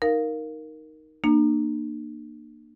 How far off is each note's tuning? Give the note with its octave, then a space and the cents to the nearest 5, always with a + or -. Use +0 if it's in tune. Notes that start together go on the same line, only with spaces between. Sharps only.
D#4 +0 A#4 +0 F5 +0
A#3 +0 D4 +45